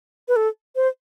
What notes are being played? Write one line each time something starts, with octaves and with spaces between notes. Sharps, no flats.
B4
A4
C5